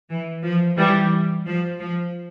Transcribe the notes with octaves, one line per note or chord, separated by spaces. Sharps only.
E3
F3
E3 G3
F3
F3